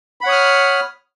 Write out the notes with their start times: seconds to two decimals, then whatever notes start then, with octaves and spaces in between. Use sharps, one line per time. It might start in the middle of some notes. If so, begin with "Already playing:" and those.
0.21 B5
0.24 F#5
0.26 C#5
0.29 D#6
0.32 F6